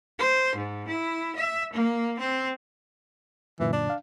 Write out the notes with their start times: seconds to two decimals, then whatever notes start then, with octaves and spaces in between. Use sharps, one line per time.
0.19 C5
0.55 G#2
0.88 E4
1.36 E5
1.73 A#3
2.19 C4
3.60 F#2 A#2 D3 E3
3.73 D4
3.90 F5